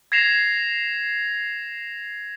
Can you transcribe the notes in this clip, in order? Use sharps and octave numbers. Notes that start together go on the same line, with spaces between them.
G#6 A#6 C7 E7 F7